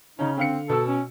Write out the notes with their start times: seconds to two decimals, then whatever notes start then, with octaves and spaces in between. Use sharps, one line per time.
0.19 C#3 C#4 D#4
0.37 D3 C4 F5 C#7
0.69 B2 A4 E6
0.88 C#4